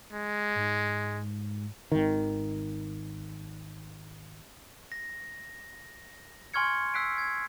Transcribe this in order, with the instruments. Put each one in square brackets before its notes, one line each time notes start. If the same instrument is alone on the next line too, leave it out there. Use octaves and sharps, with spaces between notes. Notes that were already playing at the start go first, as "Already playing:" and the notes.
[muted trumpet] G#3
[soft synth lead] G#2
[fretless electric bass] G#1 D#3
[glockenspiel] A#6
G#5 C6 C#6 F6 G#6 C#7
E6 F#6 B6 C7 D7
G#6